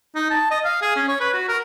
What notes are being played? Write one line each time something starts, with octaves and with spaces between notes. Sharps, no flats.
D#4
A5
D#5
F5
G#4
C#4
C#5
B4
F#4
A#4